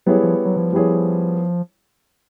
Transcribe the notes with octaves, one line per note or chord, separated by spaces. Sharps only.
F#3 G3 B3 E4 G#4 C#5
F3
F#3
F3
G3 B3 E4 G#4 C#5